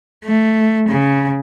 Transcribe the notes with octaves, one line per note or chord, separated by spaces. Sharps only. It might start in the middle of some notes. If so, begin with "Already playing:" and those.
A3
C#3